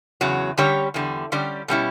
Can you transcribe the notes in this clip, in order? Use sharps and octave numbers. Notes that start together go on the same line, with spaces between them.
E2 C#3 F#3
D3 G3 C#4 G4 C#5
E2 D3 G3
D3 G3 C#4 G4 D5
B2 G3 C#4 E4